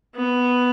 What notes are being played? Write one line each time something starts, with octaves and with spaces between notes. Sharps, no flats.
B3